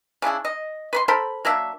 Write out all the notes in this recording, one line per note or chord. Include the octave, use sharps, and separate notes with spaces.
C#3 D4 E4 G#4
D#5
B4 B5 C6
A4 A#4 C5 B5
F#3 A#3 D4 E5